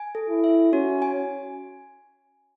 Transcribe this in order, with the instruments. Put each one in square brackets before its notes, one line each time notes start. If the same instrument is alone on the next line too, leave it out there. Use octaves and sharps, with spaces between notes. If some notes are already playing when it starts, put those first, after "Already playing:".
Already playing: [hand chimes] G#5
A4
[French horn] E4
[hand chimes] E5
[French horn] C#4 [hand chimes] F#4
[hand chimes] G#5